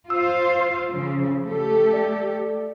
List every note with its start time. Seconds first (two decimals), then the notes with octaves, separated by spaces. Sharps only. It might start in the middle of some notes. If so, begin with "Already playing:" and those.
0.10 F4 C5 F5 E6
0.92 C#3 F3
1.45 A3 G4 A4
1.93 D5